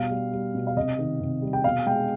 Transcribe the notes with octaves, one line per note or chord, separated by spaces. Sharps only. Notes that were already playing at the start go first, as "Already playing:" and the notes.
Already playing: B2 G3 F5
G3
G3
B2
F5
C3 D#5
D#3
C3
G3
G5
B2 F5
G#3 G5